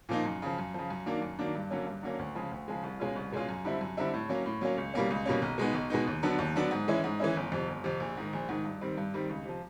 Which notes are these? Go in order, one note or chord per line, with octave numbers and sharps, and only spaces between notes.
A#2 F3 A#3 D#4
F#2
C#3 F3
F#2
C#3 F3
F#2
D#3 F#3 A#3 D4
F#2
D#3 F#3 A#3 D4
G2
D3 F#3 A#3 C#4
G2
D3 F#3 A#3 C#4
D2
C#3 F3 G#3
D2
C#3 F3 G#3
C2
B2 G#3 C#4 F4
C2
B2 G#3 C#4 F4
F#2
D3 G3 C4 E4
F#2
D3 G3 C4 E4
A2
F#3 A#3 C#4
A2
F#3 A#3 C#4
C#2
B2 G3 A#3 C#4
C#2
B2 G3 A#3 C#4
B1
B2 G#3 B3 D#4
B1
B2 G#3 B3 D#4
D#2
D3 F#3 B3 D4
D#2
D3 F#3 B3 D4
G#2
E3 G#3 C#4 E4
G#2
E3 G#3 C#4 E4
G1
F2 C3
G1
F2 C3
A#1
G#2 D#3
A#1
G#2 D#3
G2
D#3 G3 C4
G2
D#3 G3 C4
C#2
C3 F3